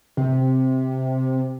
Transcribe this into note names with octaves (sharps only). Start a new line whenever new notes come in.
C3